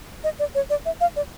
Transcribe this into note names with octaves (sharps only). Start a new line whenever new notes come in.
D#5
D5
C#5
D5
E5
F5
D5